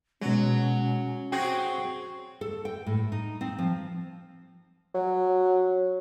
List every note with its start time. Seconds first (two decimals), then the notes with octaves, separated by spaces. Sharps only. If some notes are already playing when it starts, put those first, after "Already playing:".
0.21 B2 F#3 G#3 C#4
1.32 C4 F#4 G#4 G5 C#6
2.41 A4
2.65 G5
2.86 A2
3.12 D#4
3.41 C4
3.59 F3
4.94 F#3